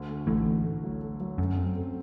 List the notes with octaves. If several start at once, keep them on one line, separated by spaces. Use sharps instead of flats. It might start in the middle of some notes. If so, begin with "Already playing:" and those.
Already playing: D2
A3
A1 A2 A3
A3
A3
F#3
A3
F#3
F#2 A3
C4
A3